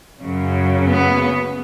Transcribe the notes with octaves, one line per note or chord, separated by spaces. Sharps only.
F#2 C#3 F#3
B3